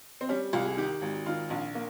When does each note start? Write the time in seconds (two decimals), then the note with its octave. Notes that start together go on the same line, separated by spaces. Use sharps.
0.21 C4
0.29 G3 C#4
0.53 C2 F4
0.65 G#4
0.77 D#3 G4
1.02 G#1
1.26 D#3 F4
1.50 A#1
1.75 A#3